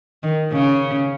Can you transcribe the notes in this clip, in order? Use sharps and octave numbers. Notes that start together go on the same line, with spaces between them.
D#3
C#3